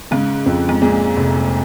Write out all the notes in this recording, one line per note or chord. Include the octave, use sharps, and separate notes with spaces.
G#2 C#3
F2
G#2
A#2 G#3
F1